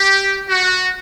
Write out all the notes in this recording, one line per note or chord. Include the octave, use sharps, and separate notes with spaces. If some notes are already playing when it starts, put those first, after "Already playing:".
Already playing: G4
F#4